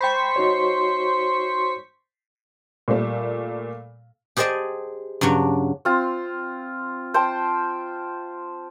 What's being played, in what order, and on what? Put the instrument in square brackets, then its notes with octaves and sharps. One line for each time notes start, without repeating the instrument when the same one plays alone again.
[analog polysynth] C5 C#6 B6 [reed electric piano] G5 B5
[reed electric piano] D#4 F#4 C#5
[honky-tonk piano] A#2 G3 A3
[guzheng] G4 G#4 C5 D5 D#5 A5
G2 C#3 F#3 D4
[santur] C4 F4
C5 G5 A5